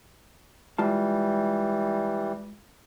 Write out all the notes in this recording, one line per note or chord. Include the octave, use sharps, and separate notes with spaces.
E3 G3 G#3 F4 A5